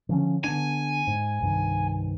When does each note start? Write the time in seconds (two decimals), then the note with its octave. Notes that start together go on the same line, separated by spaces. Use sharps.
0.09 D3 F3 C#4
0.44 D3 B3 D4 G#5
1.07 G#2
1.40 C2 G2 D#3